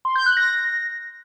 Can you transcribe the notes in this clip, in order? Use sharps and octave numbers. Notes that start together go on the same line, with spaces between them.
C6
G6
F#6
A#6